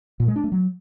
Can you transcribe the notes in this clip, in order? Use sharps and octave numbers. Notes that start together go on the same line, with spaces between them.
A#2
G#3
D4
A3
F#3